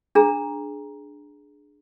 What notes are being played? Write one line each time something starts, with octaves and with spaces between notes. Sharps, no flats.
D4 G#4 A#5